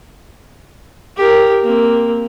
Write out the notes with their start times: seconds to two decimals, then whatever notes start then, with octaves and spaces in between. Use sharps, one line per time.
1.17 G4 A#4
1.64 A#3 C4